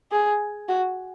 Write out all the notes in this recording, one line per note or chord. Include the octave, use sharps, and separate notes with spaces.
G#4
F#4